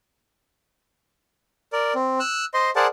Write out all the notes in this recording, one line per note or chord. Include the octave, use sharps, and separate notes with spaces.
A#4 D5
C4
E6 F#6
C5 D#5 C6
G#4 A#4 C5 D5 F#5 A5